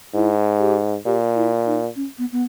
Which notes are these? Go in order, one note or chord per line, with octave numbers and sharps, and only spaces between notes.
G#2 E4
G4
A#2 G4
E4
D#4
C#4
B3
B3